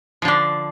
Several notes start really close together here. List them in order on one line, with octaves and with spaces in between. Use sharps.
F3 D3 D4